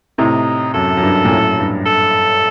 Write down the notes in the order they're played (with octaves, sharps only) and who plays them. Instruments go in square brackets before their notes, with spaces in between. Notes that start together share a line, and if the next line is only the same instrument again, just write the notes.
[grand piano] A2 C3 [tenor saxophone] D#4
[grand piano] F#2 [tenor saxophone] A4
[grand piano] F#2
G2
A#2
F#2 A2
G2
[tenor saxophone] A4